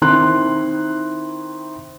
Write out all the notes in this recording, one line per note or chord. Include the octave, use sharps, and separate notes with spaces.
D#3 C4 D#4 E4 C6 F#6